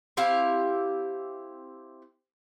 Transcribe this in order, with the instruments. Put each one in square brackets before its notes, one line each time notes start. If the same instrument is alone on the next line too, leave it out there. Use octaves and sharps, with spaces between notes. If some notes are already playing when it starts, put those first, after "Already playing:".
[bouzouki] C4 E4 G4 F5